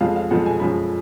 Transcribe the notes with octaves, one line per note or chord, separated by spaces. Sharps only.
F2 F3 G#3 F5
F5
F2 F3 G#3 F#5
G#5
F#2 F3 G#3 B5